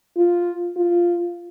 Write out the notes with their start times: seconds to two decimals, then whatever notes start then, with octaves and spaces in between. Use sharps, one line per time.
0.17 F4
0.76 F4